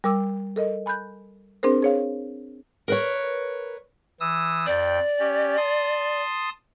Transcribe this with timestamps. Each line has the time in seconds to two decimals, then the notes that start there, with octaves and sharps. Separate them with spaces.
0.04 G3 A#4 D6 E6
0.56 A4 A#4 D#5
0.86 G#5 B5 F#6 G6
1.63 C4 D4 G#4 A#4 C5
1.83 G#4 C#5 F5
2.88 A#4 B4 C#5
4.20 E3 D#6 E6
4.66 F2 D5 G5
5.19 C#4 G4
5.57 A5 C6 D#6